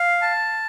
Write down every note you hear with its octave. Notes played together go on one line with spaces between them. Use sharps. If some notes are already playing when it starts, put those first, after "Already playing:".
Already playing: F5
A5